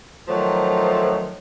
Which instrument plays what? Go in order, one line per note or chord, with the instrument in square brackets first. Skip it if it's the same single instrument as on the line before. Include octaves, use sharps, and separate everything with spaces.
[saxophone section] D#3 F3 F#3 A3